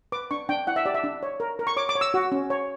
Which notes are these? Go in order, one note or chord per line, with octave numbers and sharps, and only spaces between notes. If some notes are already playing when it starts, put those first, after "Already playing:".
B4 D6
D4 C#6
D4 G5
E4 F#5
E5
G4 D5
E5
D4
C#5
A#4
A#4
C#6
C#5 D6
D6
C#5
E6
F#4
C#4
C#5